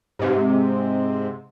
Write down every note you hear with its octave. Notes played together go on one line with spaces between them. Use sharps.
G#2 C3